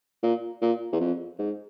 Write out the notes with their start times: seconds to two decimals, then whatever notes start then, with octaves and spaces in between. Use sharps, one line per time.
0.23 A#2
0.61 A#2
0.92 E2
1.00 F2
1.39 G#2